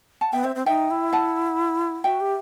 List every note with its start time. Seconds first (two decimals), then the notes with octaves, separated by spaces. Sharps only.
0.21 F#5 A5
0.33 B3 E5 G5
0.44 C4 C5 E5
0.55 C4
0.66 D#4 E5 G5
0.90 E4
1.13 F#5 A5
2.04 F#4 E5 G5
2.20 G4